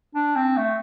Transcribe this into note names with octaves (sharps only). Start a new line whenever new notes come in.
D4
C4
A3